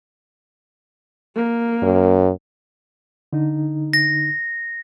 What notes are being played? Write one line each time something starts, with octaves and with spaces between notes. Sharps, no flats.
A#3
F#2
D3 D#4
A#6